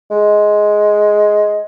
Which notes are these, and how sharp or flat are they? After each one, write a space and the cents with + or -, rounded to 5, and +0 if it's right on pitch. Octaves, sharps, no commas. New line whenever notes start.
G#3 +10